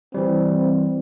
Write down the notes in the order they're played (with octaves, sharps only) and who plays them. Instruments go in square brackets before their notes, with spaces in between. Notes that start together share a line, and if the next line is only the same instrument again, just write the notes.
[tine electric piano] E3 G3 [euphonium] C4